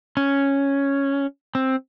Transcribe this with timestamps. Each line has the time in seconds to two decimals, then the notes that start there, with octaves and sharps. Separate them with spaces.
0.17 C#4
1.55 C4